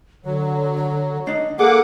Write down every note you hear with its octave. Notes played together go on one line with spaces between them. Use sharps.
D3 F#3
D4 D#4 D#5
A#3 G#4 A4 F#5 D6